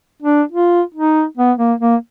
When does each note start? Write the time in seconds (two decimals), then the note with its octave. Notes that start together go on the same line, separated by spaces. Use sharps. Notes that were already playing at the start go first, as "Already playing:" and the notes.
0.22 D4
0.52 F4
0.94 D#4
1.37 B3
1.58 A#3
1.81 A#3